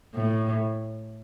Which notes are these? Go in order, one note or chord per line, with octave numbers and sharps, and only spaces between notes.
A2